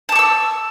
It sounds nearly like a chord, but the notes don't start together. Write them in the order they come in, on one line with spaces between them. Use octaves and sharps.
A5 D6 C#6 E6